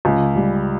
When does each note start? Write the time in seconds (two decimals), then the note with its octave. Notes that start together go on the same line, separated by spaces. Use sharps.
0.05 C#2
0.36 G3